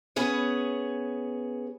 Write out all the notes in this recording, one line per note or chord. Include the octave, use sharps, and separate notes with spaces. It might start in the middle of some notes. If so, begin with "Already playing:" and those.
B3 C#4 G#4 C#5